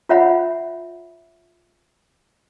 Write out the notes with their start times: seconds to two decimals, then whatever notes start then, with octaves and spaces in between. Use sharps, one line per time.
0.09 F4 C#5 E5 F#5 B5